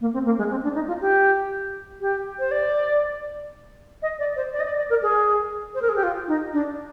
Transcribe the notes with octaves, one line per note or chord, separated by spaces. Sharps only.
A#3
C4
A#3
G#3
C4
D4
D#4
F4
G4
G4
C5
D5
D#5
D5
C5
D5
D#5
D5
D5
A#4
G#4
C5
A#4
G#4
G4
F4
D#4
D4